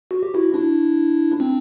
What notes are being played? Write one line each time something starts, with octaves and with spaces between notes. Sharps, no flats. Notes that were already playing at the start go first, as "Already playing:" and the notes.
F#4
G4
E4 F#4
D4 E4
C4 D4